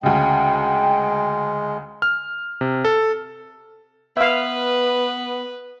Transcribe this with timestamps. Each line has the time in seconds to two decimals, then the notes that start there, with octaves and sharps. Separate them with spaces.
0.03 D2 C#3 G#3 G5
2.02 F6
2.61 C3
2.85 A4
4.17 B3 B4 E5 F5